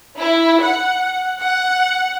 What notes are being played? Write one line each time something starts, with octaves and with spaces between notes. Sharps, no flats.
E4
F#5
F#5